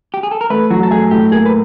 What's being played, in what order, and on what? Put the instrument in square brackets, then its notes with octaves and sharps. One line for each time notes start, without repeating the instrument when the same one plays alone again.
[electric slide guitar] G4
G#4
A4
A#4
[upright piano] A3 [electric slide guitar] B4
[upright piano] F#3 [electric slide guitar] F#4
[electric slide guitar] A4
[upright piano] A3 [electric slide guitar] G#4
[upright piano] A2 [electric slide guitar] G4
[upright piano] A#3 [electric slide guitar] G#4
[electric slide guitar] B4